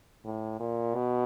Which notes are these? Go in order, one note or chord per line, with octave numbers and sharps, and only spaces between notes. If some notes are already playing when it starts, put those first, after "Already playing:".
A2
A#2
B2